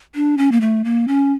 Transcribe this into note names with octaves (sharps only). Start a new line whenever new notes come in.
D4
C#4
A#3
A3
A#3
C#4